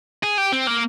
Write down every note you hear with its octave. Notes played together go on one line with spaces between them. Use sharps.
G#4
G4
C4
A#3